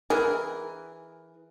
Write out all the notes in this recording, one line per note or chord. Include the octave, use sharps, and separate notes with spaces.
E3 G#4 A#4